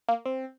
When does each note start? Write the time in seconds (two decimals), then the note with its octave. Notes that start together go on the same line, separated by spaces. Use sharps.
0.09 A#3
0.26 C4